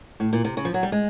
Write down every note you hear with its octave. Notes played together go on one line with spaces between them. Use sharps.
A2
A#2
C3
C#3
F3
F#3
G3
G#3